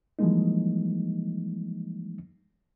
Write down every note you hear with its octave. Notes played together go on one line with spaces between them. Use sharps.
E3 F3 G3 G#3 A#3 D#4